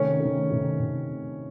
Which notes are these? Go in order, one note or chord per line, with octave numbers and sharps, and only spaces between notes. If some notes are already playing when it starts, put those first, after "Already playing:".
Already playing: C3 D#3 A3 C#4 C#5
C3 D#3 A3
C3 D#3 A3
C3